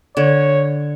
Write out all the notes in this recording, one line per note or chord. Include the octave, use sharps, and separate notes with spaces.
D3 C#5